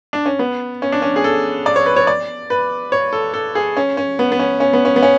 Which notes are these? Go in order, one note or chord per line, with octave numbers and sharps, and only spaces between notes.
D4
C#4
B3
C#4
D4
C#4
G#4
A4
D5
C#5
B4
C#5
D5
B4
C#5
A4
A4
G#4
C#4
C#4
B3
B3
C#4
C#4
B3
C#4
B3
C#4